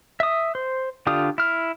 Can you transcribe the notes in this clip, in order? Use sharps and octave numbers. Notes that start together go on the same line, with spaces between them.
E5 D#6
C5
D3 D4 F4 G4 D#6
E4 F6